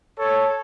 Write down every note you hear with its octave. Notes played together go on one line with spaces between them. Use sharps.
A4 C#5